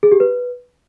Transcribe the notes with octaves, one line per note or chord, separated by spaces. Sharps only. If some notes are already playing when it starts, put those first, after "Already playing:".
G#4
G4
B4